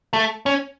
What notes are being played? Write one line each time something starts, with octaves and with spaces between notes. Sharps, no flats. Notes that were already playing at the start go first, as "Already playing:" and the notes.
A3
C#4